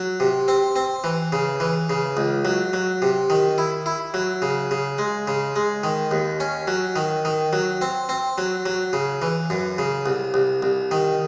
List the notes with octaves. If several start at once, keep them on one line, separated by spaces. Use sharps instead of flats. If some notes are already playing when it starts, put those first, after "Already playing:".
Already playing: F#3
C3
C4
C4
E3
C#3
E3
C#3
C#2
F#3
F#3
C3
D#3
E4
E4
F#3
C#3
C#3
G#3
C#3
G#3
D#3
D#2
C#4
F#3
D#3
D#3
F#3
C4
C4
F#3
F#3
C#3
E3
F#2
C#3
C2
C2
C2
D#3